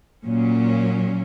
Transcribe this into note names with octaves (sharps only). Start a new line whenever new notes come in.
A#2 F#3 C#4